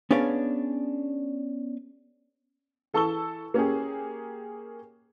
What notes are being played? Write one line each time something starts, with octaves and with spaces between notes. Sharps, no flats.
B3 C#4 D4 G#4 D5 F5
E3 A4 A5 C#6 E6 G7
A#3 C#4 G4 G#4